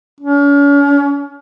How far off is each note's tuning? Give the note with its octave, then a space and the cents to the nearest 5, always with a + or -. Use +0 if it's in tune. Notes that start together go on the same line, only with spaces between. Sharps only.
C#4 +40